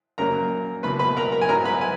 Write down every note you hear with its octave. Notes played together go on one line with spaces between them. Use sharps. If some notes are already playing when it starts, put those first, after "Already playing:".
F#2 C#3 F#3 A#3 A#4 A#5
C#2 B2 A#3 B4 B5
B4 B5
A#4 A#5
A#4 A#5
G#5
G#2 F#3 B3 A#4 A#5
B4 B5
G#5